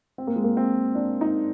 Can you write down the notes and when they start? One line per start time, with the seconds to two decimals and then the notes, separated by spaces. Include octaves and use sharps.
0.18 C4
0.27 A#3
0.36 G#3
0.44 A#3
0.57 C4
0.95 D4
1.21 D#4